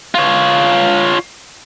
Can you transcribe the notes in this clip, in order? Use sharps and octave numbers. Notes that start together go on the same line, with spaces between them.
F4 C#5